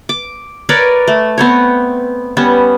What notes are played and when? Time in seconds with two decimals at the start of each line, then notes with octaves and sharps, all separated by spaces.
0.09 D6
0.69 A#4 B4 C#5 D5
1.07 A3
1.38 B3 C4 C#5
2.37 G3 B3 C#4